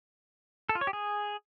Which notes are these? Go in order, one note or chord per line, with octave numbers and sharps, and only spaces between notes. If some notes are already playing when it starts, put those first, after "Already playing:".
A4
F4
C#5
G4
G#4